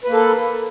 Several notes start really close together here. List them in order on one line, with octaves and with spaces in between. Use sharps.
B4 A#3 A4